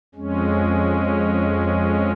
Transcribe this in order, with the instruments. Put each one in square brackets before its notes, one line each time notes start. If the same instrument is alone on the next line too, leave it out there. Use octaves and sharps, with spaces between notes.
[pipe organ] F2 G#3 C#4